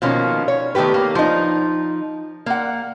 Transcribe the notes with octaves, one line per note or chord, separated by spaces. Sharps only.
B2 D#3 F3 A#3 C#4
C#5
D#3 A3 B3 G4 B4
A#3
F3 D#4
A#3 F#5